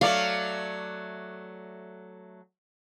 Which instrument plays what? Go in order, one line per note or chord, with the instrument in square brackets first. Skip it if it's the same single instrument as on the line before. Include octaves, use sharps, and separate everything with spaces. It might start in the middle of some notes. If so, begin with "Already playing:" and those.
[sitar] F#3 A3 D5 [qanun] F5